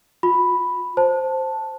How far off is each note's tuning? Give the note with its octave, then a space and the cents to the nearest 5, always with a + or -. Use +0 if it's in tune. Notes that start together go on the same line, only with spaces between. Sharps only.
F4 +40 B5 +0
C5 +0 A5 +0